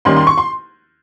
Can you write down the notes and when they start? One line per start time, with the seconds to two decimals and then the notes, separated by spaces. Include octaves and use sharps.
0.05 D#2 D#3 G3 C#4 C6
0.16 C6
0.27 C#6
0.38 C6